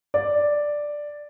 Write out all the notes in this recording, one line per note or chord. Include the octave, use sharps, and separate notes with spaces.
D5